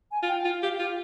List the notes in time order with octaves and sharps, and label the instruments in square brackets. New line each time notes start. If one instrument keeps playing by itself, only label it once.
[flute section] G#5
[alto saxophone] F4
[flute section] G5
[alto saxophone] F4 [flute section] F5
[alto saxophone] G4 [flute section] F5
[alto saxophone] F4 [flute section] G4